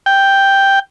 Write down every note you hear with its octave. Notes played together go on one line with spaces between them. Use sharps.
G5